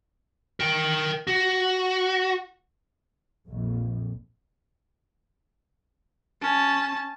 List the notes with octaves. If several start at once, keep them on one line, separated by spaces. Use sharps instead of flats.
A#4 G5
F#4
A#1 F2
C#4 A5